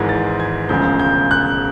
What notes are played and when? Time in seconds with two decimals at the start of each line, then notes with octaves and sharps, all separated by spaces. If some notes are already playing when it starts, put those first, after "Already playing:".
Already playing: G#1 G#2 E3 G#3 G#6
0.09 A6
0.40 G#6
0.69 E1 D2 C#3 F3 G#3 G6
0.99 G6
1.31 F#6